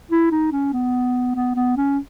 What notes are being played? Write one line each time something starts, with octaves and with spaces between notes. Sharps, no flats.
E4
D#4
C#4
B3
B3
B3
C#4